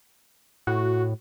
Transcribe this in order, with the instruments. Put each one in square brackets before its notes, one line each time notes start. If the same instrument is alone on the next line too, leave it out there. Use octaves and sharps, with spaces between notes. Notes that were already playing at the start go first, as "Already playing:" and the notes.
[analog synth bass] A2 [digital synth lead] F#4